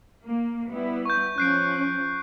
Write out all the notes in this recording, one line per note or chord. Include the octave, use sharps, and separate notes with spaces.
A#3
G3 B3 E4
C#6 G6
F3 C#4 F#6 C7 D7